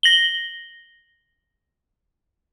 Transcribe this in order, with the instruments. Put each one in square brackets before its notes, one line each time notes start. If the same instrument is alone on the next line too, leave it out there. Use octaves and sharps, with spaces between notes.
[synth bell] A#6 F#7 G7